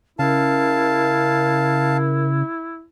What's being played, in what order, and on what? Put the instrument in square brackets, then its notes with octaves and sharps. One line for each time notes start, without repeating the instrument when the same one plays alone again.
[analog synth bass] C#3 [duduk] E4 [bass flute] A#4 [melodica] F5 A5